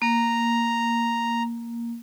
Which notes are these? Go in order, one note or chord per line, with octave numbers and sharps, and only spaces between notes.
A#3 A#5